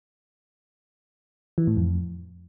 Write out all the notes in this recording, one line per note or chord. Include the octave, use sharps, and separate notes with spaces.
E3
A2
F2